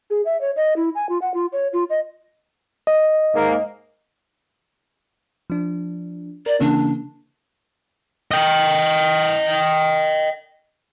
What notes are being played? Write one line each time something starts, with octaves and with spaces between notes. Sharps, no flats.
G#4
E5
C#5
D#5
E4
G#5
F4
F#5
F4
C#5
F4
D#5
D#5
G#2 A#3
F3 D4
A#4 D5
C#3 E3 A#3 D4
D#5 G5